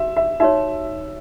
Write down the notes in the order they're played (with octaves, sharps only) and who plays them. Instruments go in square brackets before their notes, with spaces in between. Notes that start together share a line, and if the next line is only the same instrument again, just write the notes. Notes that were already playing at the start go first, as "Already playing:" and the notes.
Already playing: [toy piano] F#4 [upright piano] E5
[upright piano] E5
[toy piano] D#4 F#4 C#5 [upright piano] E5